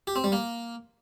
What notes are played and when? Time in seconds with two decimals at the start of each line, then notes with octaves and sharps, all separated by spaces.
0.07 G4
0.16 C4
0.24 G3
0.32 A#3